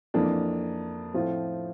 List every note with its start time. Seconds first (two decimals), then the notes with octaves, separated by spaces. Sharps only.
0.14 F2 E3 A#3 D4
1.14 A2 F3 C4 F4